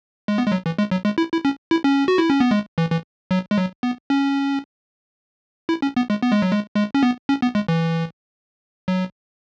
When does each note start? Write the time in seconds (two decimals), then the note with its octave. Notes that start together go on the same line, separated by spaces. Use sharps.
0.28 G#3
0.38 B3
0.47 G#3
0.52 F#3
0.66 E3
0.78 G#3
0.91 F#3
1.05 G#3
1.18 E4
1.32 E4
1.45 C#4
1.71 E4
1.84 C#4
2.08 F#4
2.18 E4
2.30 C#4
2.40 B3
2.51 G#3
2.78 E3
2.92 E3
3.31 F#3
3.51 G#3
3.57 F#3
3.83 B3
4.10 C#4
5.69 E4
5.82 C#4
5.96 B3
6.10 G#3
6.23 B3
6.32 G#3
6.42 F#3
6.52 G#3
6.76 G#3
6.95 C#4
7.03 B3
7.29 C#4
7.42 B3
7.55 G#3
7.68 E3
8.88 F#3